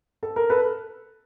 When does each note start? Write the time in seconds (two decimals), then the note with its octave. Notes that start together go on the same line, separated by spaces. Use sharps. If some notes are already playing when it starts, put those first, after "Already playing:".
0.23 A4
0.36 A#4
0.50 A4 B4